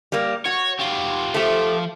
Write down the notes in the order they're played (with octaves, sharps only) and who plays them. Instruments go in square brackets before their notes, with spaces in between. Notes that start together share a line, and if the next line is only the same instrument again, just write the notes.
[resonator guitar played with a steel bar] G3 A#3
[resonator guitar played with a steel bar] F#4 [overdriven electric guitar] C#5
[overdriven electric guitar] F4 G4
[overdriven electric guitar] F3 [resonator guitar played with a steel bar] A3 G4